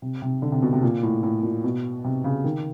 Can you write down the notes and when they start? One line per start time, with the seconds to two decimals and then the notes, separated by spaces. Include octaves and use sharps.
0.02 C3
0.22 C3
0.42 D3
0.52 C3
0.62 B2
0.73 C3
0.82 A#2
1.03 A2
1.23 A2
1.43 A#2
1.64 B2
2.04 C3
2.24 C#3
2.44 D#3